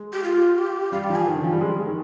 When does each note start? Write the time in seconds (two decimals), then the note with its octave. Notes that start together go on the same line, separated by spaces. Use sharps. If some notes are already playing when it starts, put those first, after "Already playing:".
Already playing: G#3
0.13 G4
0.24 F4
0.58 G4
0.92 G3 F5
1.04 G5
1.10 F3
1.15 G#5
1.27 D#3
1.35 D3
1.43 F3
1.52 G3
1.61 G#3
1.78 G#3
1.87 D#3